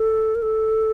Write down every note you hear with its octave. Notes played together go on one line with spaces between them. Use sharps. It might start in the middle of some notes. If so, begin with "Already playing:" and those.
Already playing: A4
A#4
A4